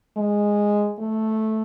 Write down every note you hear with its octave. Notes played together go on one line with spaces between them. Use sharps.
G#3
A3